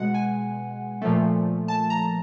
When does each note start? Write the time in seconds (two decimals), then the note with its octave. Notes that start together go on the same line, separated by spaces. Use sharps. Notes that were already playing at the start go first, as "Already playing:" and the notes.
Already playing: B2 G#3 F#5
0.14 G#5
1.02 A#2 F3 A3
1.68 A5
1.90 A#5